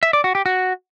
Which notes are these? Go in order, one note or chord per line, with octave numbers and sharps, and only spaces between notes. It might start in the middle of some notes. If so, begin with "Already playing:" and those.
E5
D5
F#4
G4
F#4